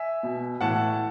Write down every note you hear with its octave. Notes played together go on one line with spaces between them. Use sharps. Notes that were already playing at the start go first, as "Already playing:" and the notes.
Already playing: E5 G#5
B2
A2 E3 F#5 A5